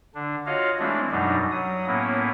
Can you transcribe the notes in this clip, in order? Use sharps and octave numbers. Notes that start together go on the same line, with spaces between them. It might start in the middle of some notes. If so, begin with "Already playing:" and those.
D3 D4
F4 F#4 C#5 D#5 F5
E3 G#3 A3 C4 D4 E4
F#2 B2 F#3 G3 D4 D#4
F#3 D#6
A2 A#3 B3 C#4 E4